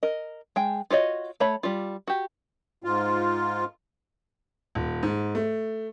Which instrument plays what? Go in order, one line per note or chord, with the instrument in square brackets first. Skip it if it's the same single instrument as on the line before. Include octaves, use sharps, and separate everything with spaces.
[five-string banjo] A#4 D#5
G#3 G5
F4 F#4 C#5 D#5
A3 C#5 B5
G3 F4
F#4 G4
[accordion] G#2 F4
[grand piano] D#1
G#2
A3